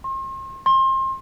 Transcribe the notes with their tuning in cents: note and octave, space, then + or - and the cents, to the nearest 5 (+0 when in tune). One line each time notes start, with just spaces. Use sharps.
C6 +40
C6 +30